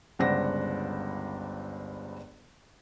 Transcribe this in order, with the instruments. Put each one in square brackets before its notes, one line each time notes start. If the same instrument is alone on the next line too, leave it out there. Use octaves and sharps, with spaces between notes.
[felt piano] G1 C#2 C5 D5 F#5 A#6